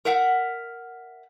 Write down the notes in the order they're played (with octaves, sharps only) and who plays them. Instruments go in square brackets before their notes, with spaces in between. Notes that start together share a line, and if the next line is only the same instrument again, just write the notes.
[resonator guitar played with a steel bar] A#4 E5 F#5